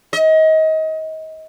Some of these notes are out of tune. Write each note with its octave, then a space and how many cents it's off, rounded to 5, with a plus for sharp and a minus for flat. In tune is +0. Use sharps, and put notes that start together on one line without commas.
D#5 +30